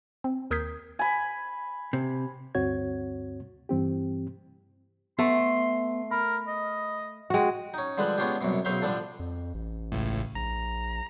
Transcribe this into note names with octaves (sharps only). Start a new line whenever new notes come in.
C4
D#2 A#4 D#6 G6 G#6 B6
G#5 B5
C3
D2 G2 C4 F#4 C#5 G#6
G2 E3 C4 G4
A3 B3 C6
A#4 B5
D#5
G#3 F#4 F#5 G5
C#4 D#4
D3 F3 G3 G#3 A4 B4
G#3 B3 C#4 D4 F4 G4
C2 F#2 B2
B1 C#3 C5 E5 F5 C6
D3 F3 G3 D4 A4
F2
A1
C#2 A2
A#1 A#5